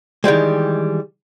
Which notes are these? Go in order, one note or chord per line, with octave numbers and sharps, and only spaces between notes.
D#3 E3 G3 G#3